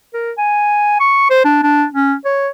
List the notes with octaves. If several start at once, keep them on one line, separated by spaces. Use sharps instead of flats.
A#4
G#5
C#6
C5
D4
D4
C#4
C#5